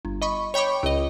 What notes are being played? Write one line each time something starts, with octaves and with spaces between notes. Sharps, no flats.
G1
D#5 B5 C#6
C#5 G5 B5 C#6 D6
C#2 D#5